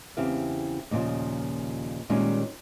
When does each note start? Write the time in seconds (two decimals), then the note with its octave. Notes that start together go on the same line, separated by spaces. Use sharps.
0.17 E2 C#3 C4 E4 G4 F5
0.91 D#2 A#2 C#3 E3 F3
2.09 A#2 D#3 G3 G#3 C#4 D#4